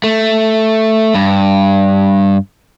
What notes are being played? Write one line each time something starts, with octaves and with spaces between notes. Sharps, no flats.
A3
G2